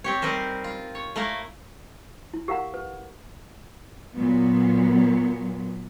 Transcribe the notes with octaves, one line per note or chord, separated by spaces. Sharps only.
C4 G4 C#5
G3 C4 D#4 A#4 C5
F4
C#5
A3 A#3 E4 A#4 F5
E4
G4 A#4 F5 F#5 A#5
B4
A#2 F#3 B3